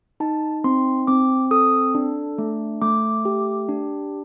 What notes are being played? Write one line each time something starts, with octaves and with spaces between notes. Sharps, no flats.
D#4 A5
C4 C6
C4 D6
A4 D#6
D4
A3
A3 D6
G4
D4